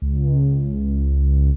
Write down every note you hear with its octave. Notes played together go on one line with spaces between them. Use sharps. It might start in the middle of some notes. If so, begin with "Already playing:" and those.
C#2